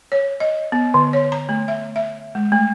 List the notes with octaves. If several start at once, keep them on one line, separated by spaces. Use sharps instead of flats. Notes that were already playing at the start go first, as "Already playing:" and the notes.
C#5
D#5
B3
D3
C#5
A#5
A3
E5
E5
G#3
A3